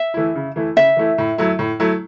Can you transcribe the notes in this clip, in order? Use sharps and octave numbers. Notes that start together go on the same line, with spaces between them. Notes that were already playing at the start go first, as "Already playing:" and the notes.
Already playing: E5
E3 A3 E4
C#3
E3 A3 E4
C#3 E5
E3 A3 E4
A2
F#3 A3 E4
A2
F#3 A3 E4